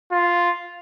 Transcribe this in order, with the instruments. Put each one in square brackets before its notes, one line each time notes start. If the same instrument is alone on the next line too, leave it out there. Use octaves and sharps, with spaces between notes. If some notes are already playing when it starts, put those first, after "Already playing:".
[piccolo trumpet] F4